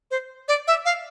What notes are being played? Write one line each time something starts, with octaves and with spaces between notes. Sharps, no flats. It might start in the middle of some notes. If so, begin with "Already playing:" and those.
C5
D5
E5
F5